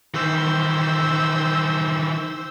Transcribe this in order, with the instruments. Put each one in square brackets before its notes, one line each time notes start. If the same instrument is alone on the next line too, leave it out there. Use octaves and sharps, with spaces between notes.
[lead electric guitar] D#3 E3 [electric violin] C5 E6